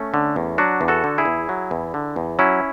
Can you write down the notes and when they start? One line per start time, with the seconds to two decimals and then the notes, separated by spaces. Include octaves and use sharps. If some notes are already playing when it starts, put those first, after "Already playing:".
Already playing: A3 C#4
0.14 D3
0.36 E2
0.58 F#3 D4 F#4
0.81 E2
0.88 F#4 A4
1.04 D3
1.18 E4 G#4
1.25 E2
1.49 F#3
1.71 E2
1.94 D3
2.16 E2
2.39 F#3 C#4 E4